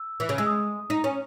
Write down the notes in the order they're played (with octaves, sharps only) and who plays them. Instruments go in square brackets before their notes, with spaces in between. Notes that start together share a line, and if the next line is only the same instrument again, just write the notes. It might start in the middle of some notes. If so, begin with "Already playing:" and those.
Already playing: [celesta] E6
[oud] E3
C#3
[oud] G#3 [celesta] E6
[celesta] D#6
[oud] D#4
C#4